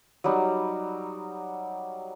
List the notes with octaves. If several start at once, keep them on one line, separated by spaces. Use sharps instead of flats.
F#3 G3 D#4